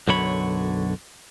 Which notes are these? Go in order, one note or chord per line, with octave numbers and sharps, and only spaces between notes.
B1 F#2 D3 F#3 C#5 B5